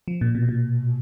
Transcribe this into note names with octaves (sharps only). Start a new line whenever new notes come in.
F3
A#2
B2
A#2